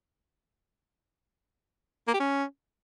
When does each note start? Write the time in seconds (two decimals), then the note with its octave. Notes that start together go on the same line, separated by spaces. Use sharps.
2.08 A#3
2.14 G4
2.20 C#4